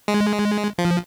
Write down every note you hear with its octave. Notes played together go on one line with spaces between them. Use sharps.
G#3
F3